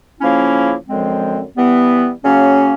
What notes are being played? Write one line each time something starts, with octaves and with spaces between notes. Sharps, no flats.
C#3 F3 A#3 C#4 E4
F#2 D3 F3 G#3 C4
E3 G3 B3
C#3 F#3 A#3 C#4